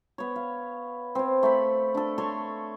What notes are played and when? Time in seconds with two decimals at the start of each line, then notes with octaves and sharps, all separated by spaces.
0.18 B3 C#5
0.36 F5
1.15 C4 C#5
1.43 A3 C5 B5
1.95 D4 A4
2.18 A4 C#5 C6 C#6